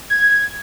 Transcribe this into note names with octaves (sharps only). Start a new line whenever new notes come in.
G#6